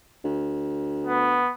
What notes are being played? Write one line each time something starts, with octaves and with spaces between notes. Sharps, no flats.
D2
B3